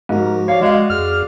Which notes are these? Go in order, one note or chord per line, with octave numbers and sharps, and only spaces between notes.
G#2 F3 F#4 G4 A#4
C#5 D5 F5
G#3 F#4 F5
F2 G#4 F6